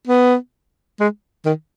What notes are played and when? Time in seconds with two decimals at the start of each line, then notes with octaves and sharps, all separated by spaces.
0.07 B3
1.00 G#3
1.46 D#3